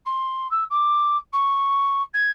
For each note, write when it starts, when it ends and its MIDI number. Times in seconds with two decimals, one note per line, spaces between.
0.05 0.49 84
0.51 0.64 88
0.70 1.17 86
1.33 2.02 85
2.14 2.31 92